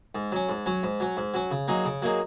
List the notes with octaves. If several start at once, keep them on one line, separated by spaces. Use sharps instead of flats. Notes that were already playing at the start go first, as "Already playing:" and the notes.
G#2
F#3 C#4
G#2
F#3 C#4
G#2
F#3 C#4
G#2
F#3 C#4
C#3
F#3 A#3 D#4 G#4
C#3
F#3 A#3 D#4 G#4